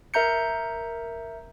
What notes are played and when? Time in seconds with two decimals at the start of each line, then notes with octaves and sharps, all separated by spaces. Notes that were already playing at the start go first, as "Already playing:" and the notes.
0.14 A#4 E5 A#5 G6 C#7